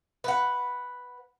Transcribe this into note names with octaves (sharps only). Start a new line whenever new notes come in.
B4 F#5